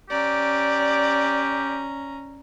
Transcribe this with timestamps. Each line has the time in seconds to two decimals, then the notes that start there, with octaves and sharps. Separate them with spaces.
0.10 C#4 G4 D5 A#5